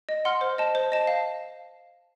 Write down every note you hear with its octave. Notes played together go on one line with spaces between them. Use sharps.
D#5
F#5 C6 F6
C5
D#5 A5
C5
D#5 A5
F5